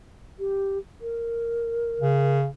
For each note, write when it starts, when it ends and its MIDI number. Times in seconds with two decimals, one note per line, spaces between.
0.39 0.78 67
1.01 2.38 70
2.00 2.48 49